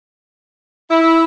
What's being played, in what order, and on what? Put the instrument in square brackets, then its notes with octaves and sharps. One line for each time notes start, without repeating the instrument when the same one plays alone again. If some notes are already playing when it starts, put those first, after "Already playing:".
[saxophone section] E4